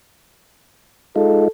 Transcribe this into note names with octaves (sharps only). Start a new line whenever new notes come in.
G#3 D#4 F4 A4